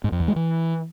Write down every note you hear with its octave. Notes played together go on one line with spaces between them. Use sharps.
G#2
F2
E2
G#3
E3